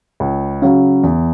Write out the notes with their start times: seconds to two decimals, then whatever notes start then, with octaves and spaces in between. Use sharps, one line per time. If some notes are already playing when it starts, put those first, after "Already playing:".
0.20 C#2
0.62 C#3 F#3
1.03 E2